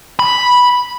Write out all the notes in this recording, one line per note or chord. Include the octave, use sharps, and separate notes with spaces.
B5